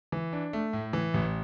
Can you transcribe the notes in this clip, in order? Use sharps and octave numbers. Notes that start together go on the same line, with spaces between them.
E3
D4
A3
A2
E3
A1